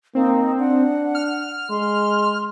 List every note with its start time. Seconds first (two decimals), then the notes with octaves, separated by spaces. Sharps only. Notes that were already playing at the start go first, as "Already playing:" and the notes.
0.15 A#3 C4 D#4
0.59 D4 F#5
1.15 F6
1.70 G#3 C6